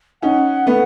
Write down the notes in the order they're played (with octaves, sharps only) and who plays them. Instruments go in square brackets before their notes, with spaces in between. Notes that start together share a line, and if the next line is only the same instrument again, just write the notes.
[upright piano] C#4 D#4 [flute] F#5
[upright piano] A3 B3